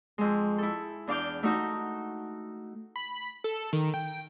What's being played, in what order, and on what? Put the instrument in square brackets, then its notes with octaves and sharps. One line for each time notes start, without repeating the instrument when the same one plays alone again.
[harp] F2 G#3
E4 A4
E2 D4 F5 D6 G6
A3 D#4 F#4
[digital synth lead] B5
A4
D#3
G5